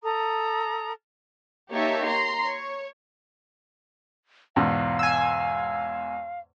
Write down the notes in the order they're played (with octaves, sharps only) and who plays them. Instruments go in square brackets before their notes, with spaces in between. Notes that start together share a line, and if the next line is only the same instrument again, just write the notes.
[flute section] A4 A#5 D#6
[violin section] A#3 D#4 G4 C#5 E5 A5
A#5 C6
C#5
[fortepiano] E2 G#2 B2 [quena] F5
[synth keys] G#5 E6